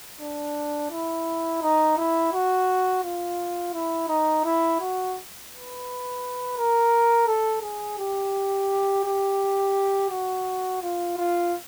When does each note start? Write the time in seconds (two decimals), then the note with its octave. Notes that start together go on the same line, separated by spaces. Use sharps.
0.20 D4
0.91 E4
1.62 D#4
1.97 E4
2.33 F#4
3.03 F4
3.73 E4
4.08 D#4
4.45 E4
4.80 F#4
5.51 B4
6.57 A#4
7.27 A4
7.62 G#4
7.99 G4
9.04 G4
10.10 F#4
10.82 F4
11.17 F4